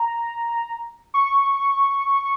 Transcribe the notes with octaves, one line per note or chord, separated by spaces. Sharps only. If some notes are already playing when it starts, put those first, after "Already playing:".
Already playing: A#5
C#6